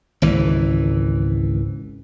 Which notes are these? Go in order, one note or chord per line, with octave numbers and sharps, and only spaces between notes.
G#1 C#2 E3